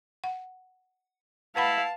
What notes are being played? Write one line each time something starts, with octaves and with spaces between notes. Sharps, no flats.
F#5
E4 B4 F5 F#5 A5 B5